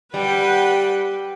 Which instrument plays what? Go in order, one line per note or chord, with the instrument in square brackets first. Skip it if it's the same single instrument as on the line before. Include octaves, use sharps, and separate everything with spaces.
[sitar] G3 [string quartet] B4 F#5 G5